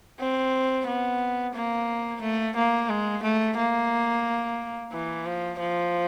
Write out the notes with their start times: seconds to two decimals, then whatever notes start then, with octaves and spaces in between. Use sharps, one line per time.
0.20 C4
0.86 B3
1.55 A#3
2.21 A3
2.56 A#3
2.89 G#3
3.23 A3
3.57 A#3
4.92 E3
5.26 F3
5.59 F3